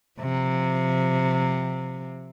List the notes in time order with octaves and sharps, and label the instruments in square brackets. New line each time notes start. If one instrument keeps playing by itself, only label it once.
[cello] C3 F3